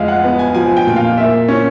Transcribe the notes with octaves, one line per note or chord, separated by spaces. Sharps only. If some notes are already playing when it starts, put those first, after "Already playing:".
Already playing: F2 G#3 F5
F#5
B3
G#5
F3 G#5
G5
A#2
F5
A#3 E5
C#4